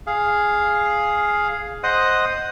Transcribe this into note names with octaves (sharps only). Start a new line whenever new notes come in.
G#4 F5
C5 D#5 F#5 D#6